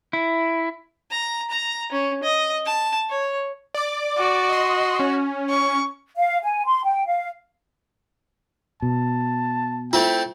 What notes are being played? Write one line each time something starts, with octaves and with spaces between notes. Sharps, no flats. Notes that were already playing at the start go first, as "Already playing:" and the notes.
E4
A#5
A#5
C#4
D#5
A5
C#5
D5 D6
F#4
D#5 C6
C#4
C#6
F5
G#5
C6
G5
F5
B2 A5
A3 C4 E4 F4 G5